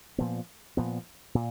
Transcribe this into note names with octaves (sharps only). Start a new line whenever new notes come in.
A#2 F3 B3
A#2 F3 B3
A#2